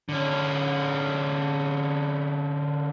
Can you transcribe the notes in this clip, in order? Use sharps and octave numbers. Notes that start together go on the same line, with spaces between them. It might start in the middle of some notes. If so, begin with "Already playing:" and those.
D3 C#4